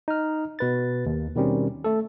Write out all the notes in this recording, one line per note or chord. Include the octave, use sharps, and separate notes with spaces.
D#4 F6
B2 B4 A6
D#2
B2 D#3 G3 C4 C#4
A3 A4